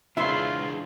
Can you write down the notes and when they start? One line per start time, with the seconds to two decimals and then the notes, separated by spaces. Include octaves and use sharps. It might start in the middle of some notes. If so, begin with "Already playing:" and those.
0.17 C#3 E3 G#3 D4 E4 F4 E5 C6